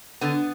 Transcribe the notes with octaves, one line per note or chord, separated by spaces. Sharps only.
D3 B3